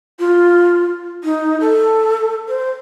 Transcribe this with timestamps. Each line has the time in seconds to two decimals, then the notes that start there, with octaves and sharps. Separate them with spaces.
0.19 F4
1.24 D#4
1.60 A4
2.49 C5